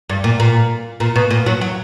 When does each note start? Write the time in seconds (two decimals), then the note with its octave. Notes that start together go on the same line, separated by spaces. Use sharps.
0.10 G2
0.24 A#2
0.40 A#2
1.00 A#2
1.16 B2
1.31 A#2
1.46 F#3
1.61 F#3